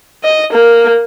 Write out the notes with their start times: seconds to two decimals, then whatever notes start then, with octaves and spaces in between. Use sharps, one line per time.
0.24 D#5
0.53 A#3